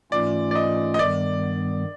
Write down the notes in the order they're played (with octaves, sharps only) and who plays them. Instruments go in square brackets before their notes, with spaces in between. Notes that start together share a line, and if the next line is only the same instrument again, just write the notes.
[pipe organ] G#2 E3 A3 C#4 F4 [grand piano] D5
[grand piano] D5
D#5
D#5
[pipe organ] G2 D#3 G3 B3 [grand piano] D5